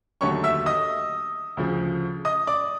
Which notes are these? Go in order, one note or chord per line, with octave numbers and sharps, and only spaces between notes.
D#2 D3 F#3 A3 C#5 C#6
E5 E6
D#5 D#6
D2 C#3 F3
D#5 D#6
D5 D6